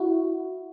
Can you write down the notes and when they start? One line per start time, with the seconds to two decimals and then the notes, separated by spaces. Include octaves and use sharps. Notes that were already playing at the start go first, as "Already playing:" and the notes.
Already playing: E4 F#4